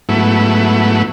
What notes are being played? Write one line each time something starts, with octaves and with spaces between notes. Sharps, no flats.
G#2 F#3 A3 B3 E4